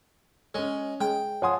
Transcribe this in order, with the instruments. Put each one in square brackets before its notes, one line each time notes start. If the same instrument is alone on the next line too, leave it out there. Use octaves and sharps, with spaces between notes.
[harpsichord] G#3 [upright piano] C#4 C#5
[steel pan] G#3 [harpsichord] G5
[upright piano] F3 G#5 D#6 [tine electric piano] C#5 F#5 C6